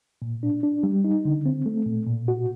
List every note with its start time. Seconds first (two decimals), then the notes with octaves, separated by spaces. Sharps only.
0.22 A#2
0.43 D4
0.63 D4
0.83 G3
1.04 D#4
1.25 D3
1.46 C4
1.66 A3
1.86 A#2
2.07 A#2
2.28 F#4